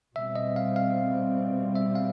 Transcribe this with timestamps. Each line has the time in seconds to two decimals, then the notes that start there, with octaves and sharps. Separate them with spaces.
0.16 B2 G3 C4 E5
0.36 D#5
0.56 F5
0.76 F5
1.76 E5
1.95 F5